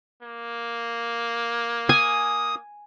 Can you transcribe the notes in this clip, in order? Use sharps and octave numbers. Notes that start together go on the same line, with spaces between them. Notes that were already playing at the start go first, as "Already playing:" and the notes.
A#3
G#5 D#6